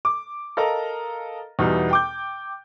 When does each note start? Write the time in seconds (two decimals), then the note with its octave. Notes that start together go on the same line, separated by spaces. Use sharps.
0.05 D6
0.57 A4 A#4 D#5 F5 A#5
1.59 E2 B2 E3 G3 D#4
1.91 G5 D6 G6